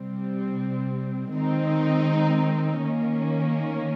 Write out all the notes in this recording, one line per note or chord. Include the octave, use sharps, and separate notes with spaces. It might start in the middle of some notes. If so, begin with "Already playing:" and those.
Already playing: C3 G3 C4
D#3 G#3 C4 D#4
D#3 A#3 C#4